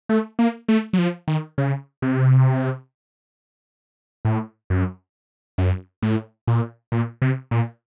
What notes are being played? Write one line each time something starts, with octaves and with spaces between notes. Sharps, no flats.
A3
A#3
A3
F#3
F3
D#3
C#3
C3
A2
F#2
F#2
A2
A#2
A#2
C3
A#2